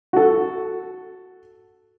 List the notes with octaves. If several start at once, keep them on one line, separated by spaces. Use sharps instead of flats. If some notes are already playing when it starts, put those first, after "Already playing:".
F#4 A4